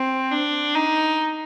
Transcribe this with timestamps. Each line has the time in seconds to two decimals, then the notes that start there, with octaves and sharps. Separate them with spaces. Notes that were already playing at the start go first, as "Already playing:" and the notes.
Already playing: C4
0.31 D4
0.74 D#4